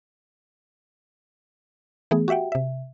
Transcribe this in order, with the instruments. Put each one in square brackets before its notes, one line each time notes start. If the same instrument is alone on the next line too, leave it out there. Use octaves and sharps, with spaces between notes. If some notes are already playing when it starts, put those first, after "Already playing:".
[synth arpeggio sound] E3 A3 B3 G#4
F#4 G4 E5 F#5 G5
C3 E5